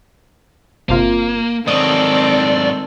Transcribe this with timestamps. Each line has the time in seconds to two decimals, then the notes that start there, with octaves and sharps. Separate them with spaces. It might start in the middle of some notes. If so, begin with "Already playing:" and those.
0.89 G1 C3 A#3 F4
1.68 G#2 D#3 F#3 C4 A4 D5 D#6